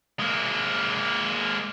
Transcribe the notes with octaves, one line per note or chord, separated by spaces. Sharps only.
G#3 A#3